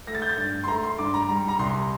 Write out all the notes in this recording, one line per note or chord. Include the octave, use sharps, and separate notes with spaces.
A3 A#6
A6
G6
A6
G2
C6
A3 A#5
C6
G2 D6
A#5
G3 A#5
A#5
C2 C6